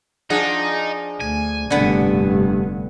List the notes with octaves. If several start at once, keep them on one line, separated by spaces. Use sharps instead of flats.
F3 D4 D#4 G#4 F#5
D2 G#5
F1 G2 D3 B3